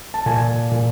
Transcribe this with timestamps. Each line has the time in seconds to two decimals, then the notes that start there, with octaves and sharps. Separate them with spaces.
0.14 A5
0.26 A#2 G#5
0.71 A#2